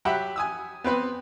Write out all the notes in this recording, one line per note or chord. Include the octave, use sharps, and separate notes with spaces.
F#3 G4 E5 F#5 B5
G#5 D#6 E6
B3 C4 B4